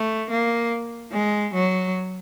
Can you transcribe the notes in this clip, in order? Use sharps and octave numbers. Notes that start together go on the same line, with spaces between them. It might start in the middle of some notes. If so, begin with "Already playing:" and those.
Already playing: A3
A#3
G#3
F#3